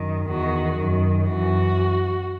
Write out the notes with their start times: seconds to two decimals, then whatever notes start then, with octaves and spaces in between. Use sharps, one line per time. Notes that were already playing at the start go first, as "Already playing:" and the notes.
Already playing: F#2 D#3
0.29 E2 D#3 F#4
0.79 F#2 D#3
1.29 F#2 E3 F#4